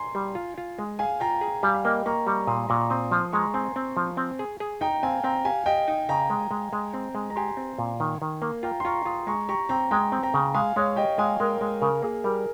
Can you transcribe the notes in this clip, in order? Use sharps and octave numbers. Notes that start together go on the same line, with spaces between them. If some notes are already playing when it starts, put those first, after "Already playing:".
Already playing: G#5 A#5 C6
G3
F4
F4
G#3
G#4 F5 G#5
F4 G5 A#5
G#4
G3 F5 G#5
F5
A#3 D#5 G5
A#3 A#5 C#6
G3 A#5 C#6
A#2 C6 D#6
A#2 A#5 C#6
C4 C6 D#6
F3 C6 D#6
G#3 A#5 C#6
C4 G#5 C6
C4
F3
C4
G#4
G#4
D#4 G5 A#5
C4 F5 G#5
C4 G5 A#5
G4 F5 G#5
G4 D#5 G5
D#4
C#3 G5 A#5
G#3
G#3
G#3
C4
G#3
A#5
G4 G#5 C6
C4
A#2
D#3
D#3
A#3
F4 G5 A#5
C6
F4 A#5 C#6
F4 C6 D#6
G#3 A#5 C#6
G4 A#5 C#6
C4 G5 A#5
G#3 G5 A#5
C4
G5 A#5
C#3
G#3 F5 G#5
G#3 C#5 F5
G4 D#5 G5
G#3 F5 G#5
G#3 A#4
G#3
C#3 A#4
A#3 G#4
G3 A#4